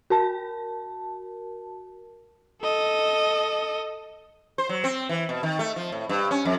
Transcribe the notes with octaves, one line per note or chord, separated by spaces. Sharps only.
F#4 A#4 A5
A4 D#5
C5
F#3
C4
E3
B2
D#3
A3
F3
A2
G2
C#4
F2